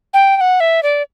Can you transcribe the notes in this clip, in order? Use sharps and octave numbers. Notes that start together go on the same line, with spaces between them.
G5
G5
F#5
E5
D5